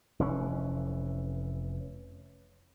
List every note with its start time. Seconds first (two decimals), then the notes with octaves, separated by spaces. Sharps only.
0.19 F1 E3 C#4